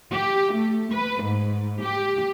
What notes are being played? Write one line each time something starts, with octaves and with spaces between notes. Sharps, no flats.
G4
A3
B4
G#2
G4